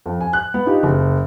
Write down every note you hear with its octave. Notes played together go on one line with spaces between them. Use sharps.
F2
G#5
F#6
B3
D4 D#4 F4 G4
F#1